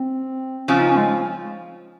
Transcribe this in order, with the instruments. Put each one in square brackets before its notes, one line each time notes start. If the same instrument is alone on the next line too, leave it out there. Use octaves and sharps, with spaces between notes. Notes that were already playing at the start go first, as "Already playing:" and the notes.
Already playing: [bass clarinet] C4
[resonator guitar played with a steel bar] C#3 F3 C4 F4 [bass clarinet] C#4
[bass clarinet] D#4
C#4
G#3